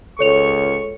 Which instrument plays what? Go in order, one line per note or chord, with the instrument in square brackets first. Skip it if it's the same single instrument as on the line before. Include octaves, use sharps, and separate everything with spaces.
[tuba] C#2 [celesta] A4 C#5 F7 [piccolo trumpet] C#6